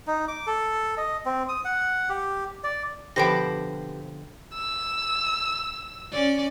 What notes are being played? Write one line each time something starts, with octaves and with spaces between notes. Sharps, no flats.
D#4
D6
A4
D#5
C4
D#6
F#5
G4
D5
B2 D3 F3 G4 B4 C5 G5 A#6
E6
C#4 D5